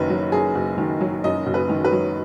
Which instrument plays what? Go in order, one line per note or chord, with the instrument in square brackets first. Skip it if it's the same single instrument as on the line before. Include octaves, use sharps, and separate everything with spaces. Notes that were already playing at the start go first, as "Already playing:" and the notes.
Already playing: [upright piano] F#1 F#2 D#3 B4
F#3
F#2 G#4
F#1
D#3
F#3
F#2 D#5
F#1
B4
D#3
B4
F#3